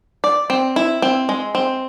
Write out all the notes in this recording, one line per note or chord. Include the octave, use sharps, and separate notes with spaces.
D5
C4
E4
C4
G#3
C4